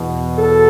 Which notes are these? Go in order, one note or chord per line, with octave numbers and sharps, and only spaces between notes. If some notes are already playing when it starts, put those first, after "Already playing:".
Already playing: E2 B2
A4